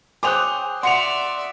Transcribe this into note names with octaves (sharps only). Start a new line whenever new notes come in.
G#4 C5 C#5 G5 D6 D#6 F#6 F7
F#4 D5 E5 C6 C#7 F7